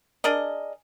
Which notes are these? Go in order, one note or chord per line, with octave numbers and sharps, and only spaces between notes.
D4 G#4 A#4 D#5